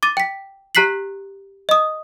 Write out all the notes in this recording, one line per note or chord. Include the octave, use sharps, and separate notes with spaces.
D6 A6 D#7
G5 B6
G4 A#5 F#6 B6 C7 F#7
D#5 D#6